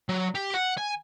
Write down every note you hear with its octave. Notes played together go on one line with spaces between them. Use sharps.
F#3
G4
F#5
G#5